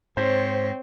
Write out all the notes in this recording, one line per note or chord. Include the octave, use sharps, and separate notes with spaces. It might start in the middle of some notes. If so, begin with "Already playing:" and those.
G#2 C4 C5 C#5